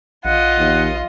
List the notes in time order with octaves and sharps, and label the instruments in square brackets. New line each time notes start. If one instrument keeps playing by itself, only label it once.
[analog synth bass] A#1 [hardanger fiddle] F4 D#5 [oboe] F#5
[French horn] D#2